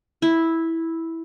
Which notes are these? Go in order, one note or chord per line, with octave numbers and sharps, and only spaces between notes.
E4